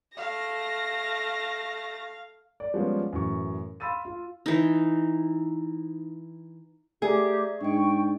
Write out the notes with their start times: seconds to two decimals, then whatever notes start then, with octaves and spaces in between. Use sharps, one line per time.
0.17 A3 F5 A#6
2.60 D5
2.74 F3 G3 G#3 B3 C#4 F4
3.13 F#2 A2 E3 C#6
3.80 F5 B5 C6 E6 A6 D#7
4.05 F4
4.46 E3 D#4
7.02 A3 G4 G#4 D5 E5 A#5
7.61 G#2 D4 D#5 G5 C#6